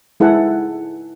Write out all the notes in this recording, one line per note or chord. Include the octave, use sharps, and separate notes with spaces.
G#3 E4 A4 B4 F#5 G#5